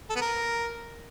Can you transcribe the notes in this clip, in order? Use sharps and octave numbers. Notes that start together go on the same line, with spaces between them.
A4
B3
A#4